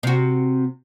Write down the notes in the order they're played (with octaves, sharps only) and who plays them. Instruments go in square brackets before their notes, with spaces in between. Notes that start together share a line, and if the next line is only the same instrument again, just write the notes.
[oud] C3 F#4